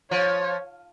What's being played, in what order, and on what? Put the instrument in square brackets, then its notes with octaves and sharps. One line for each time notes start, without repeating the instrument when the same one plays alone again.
[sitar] F3 [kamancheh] C#5